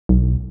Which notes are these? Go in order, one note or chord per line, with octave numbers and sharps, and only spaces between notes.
B1